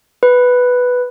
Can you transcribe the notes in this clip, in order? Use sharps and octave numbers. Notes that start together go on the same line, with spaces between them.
B4